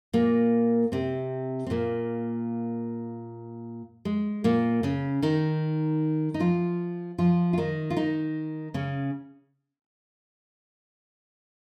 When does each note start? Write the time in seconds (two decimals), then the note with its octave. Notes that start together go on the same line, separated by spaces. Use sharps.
0.13 A#2 A#3
0.92 C3 C4
1.66 C4
1.70 A#2 A#3
4.05 G#3
4.44 A#2 A#3
4.83 C#3 C#4
5.22 D#3 D#4
6.34 D#4
6.40 F3 F4
7.18 F3 F4
7.53 F4
7.58 D#3 D#4
7.90 F4
7.97 D#3 D#4
8.74 C#3 C#4